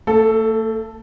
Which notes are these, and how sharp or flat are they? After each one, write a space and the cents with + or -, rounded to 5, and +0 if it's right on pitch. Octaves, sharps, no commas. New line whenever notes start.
A3 +40 A4 +0